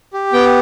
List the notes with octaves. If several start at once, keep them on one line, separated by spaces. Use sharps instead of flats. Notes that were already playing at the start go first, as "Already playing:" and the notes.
G4
B3 G5